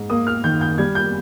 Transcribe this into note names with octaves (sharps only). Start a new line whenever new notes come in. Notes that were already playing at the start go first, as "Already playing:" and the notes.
Already playing: G#2
A#3 D#6
F6
D#3 G6
G6
G3 G#6
G6